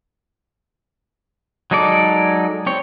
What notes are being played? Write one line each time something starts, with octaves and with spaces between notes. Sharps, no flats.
F#3 G#3 D#4 A4 D5
C4 C#5